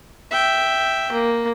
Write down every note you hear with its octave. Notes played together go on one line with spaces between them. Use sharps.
E5 G5
A#3